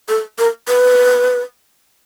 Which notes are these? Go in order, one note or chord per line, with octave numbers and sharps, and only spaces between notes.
A4
A#4
B4